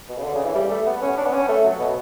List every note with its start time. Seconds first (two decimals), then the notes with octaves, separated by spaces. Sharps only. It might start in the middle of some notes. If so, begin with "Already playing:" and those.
0.09 B2
0.18 C#3
0.24 D3
0.35 C#3
0.45 E3
0.55 G3
0.70 A3
0.86 B3
1.02 C#4
1.18 D4
1.26 B3
1.33 C#4
1.49 A3
1.65 F#3
1.79 B2